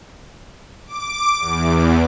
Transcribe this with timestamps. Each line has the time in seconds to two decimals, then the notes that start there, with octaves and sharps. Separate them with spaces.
0.87 D6
1.39 E2